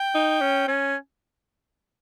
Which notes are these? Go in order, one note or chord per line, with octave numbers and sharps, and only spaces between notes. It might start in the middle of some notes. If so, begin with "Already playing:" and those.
Already playing: G5
D#4
C#4
C#4 G#5